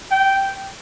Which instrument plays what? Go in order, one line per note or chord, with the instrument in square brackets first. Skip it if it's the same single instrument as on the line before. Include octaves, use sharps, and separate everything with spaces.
[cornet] G5